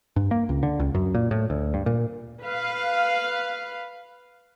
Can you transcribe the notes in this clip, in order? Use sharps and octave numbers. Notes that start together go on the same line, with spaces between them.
G2
A#3
C#2
D3
C#2
F#2
A#2
A2
D2
G2
A#2
B4 F5